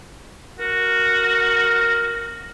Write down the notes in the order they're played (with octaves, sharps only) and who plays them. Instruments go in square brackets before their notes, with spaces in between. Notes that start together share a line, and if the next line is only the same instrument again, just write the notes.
[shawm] F#4 [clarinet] A#4